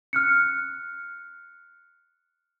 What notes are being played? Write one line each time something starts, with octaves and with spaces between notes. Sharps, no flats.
F6 F#6 C#7